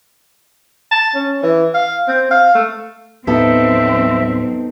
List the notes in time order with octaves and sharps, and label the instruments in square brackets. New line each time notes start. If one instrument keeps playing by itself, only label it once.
[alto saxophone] A5
C#4
E3
F5
C4
F5
A3
[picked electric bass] D#2 A2 [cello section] F#3 C4 [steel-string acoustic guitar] B3 D#4 A4 [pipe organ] E5